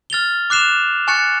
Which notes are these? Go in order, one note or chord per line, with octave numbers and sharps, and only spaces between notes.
F6 A6 F7 G7
D6 F#6 C7 E7 F7
G#5 C#6 F#6 A6 C#7